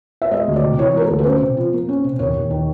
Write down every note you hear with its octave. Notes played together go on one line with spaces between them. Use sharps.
E5
G#3 D#5
D2
D5
C3
E3 C#5
G#3 A#4
A4
D2
B4
C#4 C5
C3
F3
A#3
C#4
C3
D#2 C#5
D#2
D#3